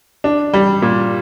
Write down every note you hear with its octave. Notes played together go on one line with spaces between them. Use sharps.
D4
G3
A#2